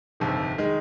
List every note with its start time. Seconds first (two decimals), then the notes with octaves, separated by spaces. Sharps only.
0.20 G1 F2 C3 D#3
0.58 D#3 G#3